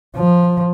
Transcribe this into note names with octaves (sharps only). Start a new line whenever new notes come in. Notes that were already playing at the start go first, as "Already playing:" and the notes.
F3